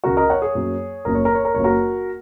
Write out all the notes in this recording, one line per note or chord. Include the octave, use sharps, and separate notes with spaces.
C#2 C#3 G#3 F#4 A#4
A#4 D#5
C#5 F#5
G#4 C#5
F#2 F#3 A#3
F#1 F#2 F#3 A#3 A#4
C#5
A#4
C#5
A#4
F#1 F#2 F#3 A#3 C#5
F#4 A#4